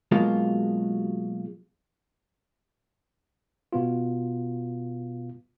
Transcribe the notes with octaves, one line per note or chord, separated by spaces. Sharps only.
B2 F#3 G#3 A#3 F4
B2 B3 F4